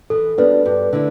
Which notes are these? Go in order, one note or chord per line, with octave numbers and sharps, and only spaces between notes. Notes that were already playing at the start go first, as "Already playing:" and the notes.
E3 A4
G3 B3 D4 F#4 B4
G2
D3 A3 E4